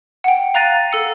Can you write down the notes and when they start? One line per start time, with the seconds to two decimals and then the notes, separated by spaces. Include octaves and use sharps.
0.24 F#5 G5
0.54 F5 A#5 F#6 A6 A#6 D#7
0.92 A4 E6 C#7